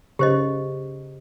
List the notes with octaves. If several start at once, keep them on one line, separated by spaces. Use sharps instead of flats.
C#3 G4 C5 D#5